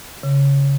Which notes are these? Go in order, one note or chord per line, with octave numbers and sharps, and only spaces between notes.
C#3